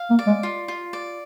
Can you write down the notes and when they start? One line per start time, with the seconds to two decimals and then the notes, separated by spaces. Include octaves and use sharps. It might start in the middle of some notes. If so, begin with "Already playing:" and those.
Already playing: F5
0.10 A#3
0.19 D5
0.27 G#3
0.43 F4
0.68 F4
0.93 D5